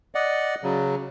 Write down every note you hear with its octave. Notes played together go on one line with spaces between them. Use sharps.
D5 D#5 F#5
C#3 F#3